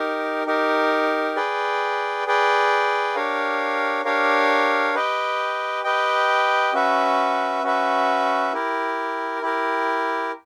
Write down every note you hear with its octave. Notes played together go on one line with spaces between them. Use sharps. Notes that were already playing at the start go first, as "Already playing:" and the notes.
Already playing: D#4 G4 A#4
D#4 G4 A#4
G#4 B4 D5 G5
G#4 B4 D5 G5
D4 G4 A#4 C#5 F5
D4 G4 A#4 C#5 F5
G4 B4 D#5 G5
G4 B4 D#5 G5
C#4 F#4 B4 E5
C#4 F#4 B4 E5
E4 G4 A#4
E4 G4 A#4